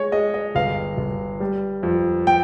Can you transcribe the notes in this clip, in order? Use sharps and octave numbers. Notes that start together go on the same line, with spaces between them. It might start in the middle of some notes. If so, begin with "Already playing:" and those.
Already playing: G#3 C#5
G#3 D#5
D#5
G1 F5
G1
G3
F2
G5